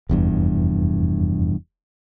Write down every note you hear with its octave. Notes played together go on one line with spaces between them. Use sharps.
F1 E2 G2